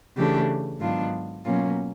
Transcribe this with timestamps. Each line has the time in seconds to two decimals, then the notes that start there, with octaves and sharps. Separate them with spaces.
0.15 C#3 E3 A3 D4 G4
0.80 G#2 D#3 F#3 B3 D4 F4
1.44 B2 F#3 A#3 C#4 F4